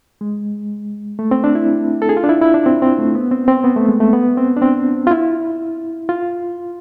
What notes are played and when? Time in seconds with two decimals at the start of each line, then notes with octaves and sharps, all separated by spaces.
0.21 G#3
1.19 A3
1.31 C4
1.44 D4
1.55 E4
2.02 A4
2.09 G#4
2.17 F4
2.24 D4
2.29 E4
2.42 E4
2.54 D4
2.66 C4
2.82 C4
2.98 A3
3.15 B3
3.31 C4
3.48 C4
3.64 B3
3.76 A3
3.88 G#3
4.00 A3
4.13 B3
4.37 C4
4.57 D4
4.62 C4
5.07 F4
5.11 E4
6.09 F4